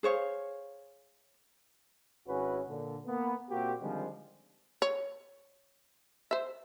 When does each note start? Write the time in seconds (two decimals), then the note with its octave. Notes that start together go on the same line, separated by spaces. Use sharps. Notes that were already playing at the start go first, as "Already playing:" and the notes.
0.03 G#4 C5 C#5 F5
2.28 G#1 C#4 E4 F#4 G#4 B4
2.68 A#2 D3
3.06 A#3 B3
3.50 A#2 A#3 C4 F#4 G4
3.81 D3 D#3 F3 G3 G#3 C4
4.82 C#5
6.31 C5 E5